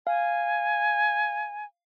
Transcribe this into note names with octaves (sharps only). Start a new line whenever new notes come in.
F5 G#5